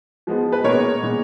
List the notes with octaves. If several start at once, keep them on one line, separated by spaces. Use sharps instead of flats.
F3 G#3 B3
B4
A#2 G#3 B3 A#4 C#5
A#2 G#3 B3